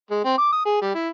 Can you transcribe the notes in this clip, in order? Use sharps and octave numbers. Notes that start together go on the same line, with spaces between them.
G#3
C4
D6
D#6
G#4
G3
E4